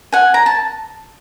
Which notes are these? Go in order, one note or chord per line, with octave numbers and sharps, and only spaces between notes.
F#5 G#5
A#5
A5